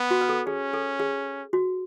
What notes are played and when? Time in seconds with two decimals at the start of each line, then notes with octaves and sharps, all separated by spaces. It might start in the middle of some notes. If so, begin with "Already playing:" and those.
Already playing: B3
0.11 F#4
0.21 B4
0.29 A4
0.47 C#4 G#4
0.74 A4
1.00 G#4
1.53 F#4